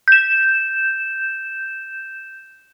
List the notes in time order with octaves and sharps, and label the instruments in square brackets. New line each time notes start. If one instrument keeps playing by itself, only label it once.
[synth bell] G6 E7